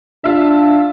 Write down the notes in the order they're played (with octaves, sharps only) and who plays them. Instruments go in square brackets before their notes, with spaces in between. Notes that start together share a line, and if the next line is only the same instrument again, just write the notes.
[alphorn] D4 [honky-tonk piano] F4 E5